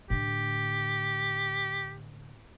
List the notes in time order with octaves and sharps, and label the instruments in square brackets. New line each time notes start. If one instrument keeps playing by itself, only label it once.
[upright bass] A2 D3 [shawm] G4